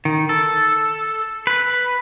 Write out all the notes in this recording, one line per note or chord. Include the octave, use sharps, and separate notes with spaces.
D#3
A4
B4